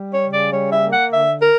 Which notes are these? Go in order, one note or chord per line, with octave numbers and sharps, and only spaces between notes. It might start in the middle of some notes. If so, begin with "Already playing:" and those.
Already playing: G3
C#5
C#3
D5
G3 C#5
E5
A#3
F#5
D3 E5
A#4